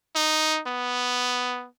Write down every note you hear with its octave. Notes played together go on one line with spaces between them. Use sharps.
D#4
B3